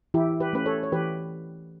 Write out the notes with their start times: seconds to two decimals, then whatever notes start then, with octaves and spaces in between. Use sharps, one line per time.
0.14 E3 E4 G4
0.40 G4 B4
0.53 A3 C#4 B4
0.66 A4 C#5
0.83 C#5
0.92 E3 G4 B4